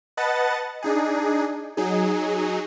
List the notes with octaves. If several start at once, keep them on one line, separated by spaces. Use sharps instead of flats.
B4 D#5 F#5 A5 A6
D4 D#4 G#4
F#3 D#4 G#4